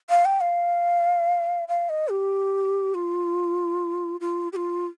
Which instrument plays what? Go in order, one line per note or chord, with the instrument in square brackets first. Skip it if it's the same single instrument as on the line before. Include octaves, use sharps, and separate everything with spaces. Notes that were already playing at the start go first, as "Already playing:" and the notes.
[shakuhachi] F5
G5
F5
F5
D#5
G4
F4
F4
G4
F4